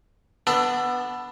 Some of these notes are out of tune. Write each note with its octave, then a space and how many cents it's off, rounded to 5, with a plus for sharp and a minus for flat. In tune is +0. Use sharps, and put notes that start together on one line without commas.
B3 +0 D4 +0 A4 +20